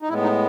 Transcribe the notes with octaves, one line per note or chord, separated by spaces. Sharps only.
D#4
A2 G#3 B3 E4
D#4